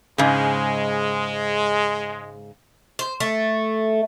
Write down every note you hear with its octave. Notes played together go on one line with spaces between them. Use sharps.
G#2 C#3 G#3
C5
A3